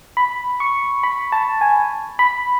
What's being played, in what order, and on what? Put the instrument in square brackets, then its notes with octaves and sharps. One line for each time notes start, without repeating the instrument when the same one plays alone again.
[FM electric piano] B5
C#6
B5
A5
G#5
B5